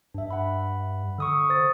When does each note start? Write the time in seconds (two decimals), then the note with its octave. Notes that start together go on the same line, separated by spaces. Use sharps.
0.14 G2 D4 E5
0.31 F#5 B5
1.18 D3 C#6 D#6 E6
1.50 C5 D#6 A6